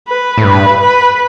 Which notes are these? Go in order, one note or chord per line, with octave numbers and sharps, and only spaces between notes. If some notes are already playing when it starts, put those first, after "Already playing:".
B4
A2
G2 B4
B4